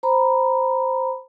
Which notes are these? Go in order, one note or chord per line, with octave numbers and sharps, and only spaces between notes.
C5 A#5 B5